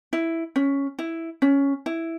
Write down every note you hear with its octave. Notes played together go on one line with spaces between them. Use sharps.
E4
C#4
E4
C#4
E4